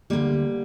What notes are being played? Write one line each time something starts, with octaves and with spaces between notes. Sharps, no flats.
D2 D3 F3 G3 A#3